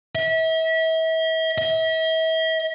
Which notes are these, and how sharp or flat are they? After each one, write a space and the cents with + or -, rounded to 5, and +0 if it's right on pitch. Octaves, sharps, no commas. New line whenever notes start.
E5 -35
E5 -40